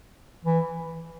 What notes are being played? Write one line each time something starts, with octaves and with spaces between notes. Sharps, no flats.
E3